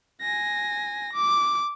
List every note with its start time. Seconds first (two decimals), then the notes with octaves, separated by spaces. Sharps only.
0.21 G#5 A#6
1.13 D6